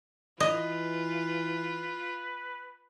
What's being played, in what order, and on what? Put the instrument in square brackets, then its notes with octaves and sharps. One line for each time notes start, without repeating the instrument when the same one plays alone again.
[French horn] E3 [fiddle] F4 [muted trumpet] B4 [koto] D#5